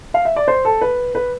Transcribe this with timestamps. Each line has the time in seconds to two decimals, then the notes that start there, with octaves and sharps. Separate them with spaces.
0.14 F5
0.25 E5
0.36 D5
0.48 C5
0.65 A4
0.81 B4
1.15 B4